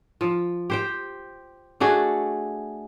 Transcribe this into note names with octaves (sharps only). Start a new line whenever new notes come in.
F3
G4 C5 G5
A3 D4 F#4 G#4